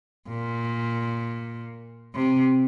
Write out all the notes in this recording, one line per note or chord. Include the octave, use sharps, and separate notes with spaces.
A#2
C3